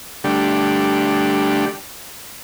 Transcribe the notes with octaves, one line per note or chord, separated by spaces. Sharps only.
D3 G3 A3 D4 G4